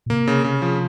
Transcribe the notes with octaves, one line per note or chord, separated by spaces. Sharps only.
A#2
C3 A#3
C#3
C#3
F3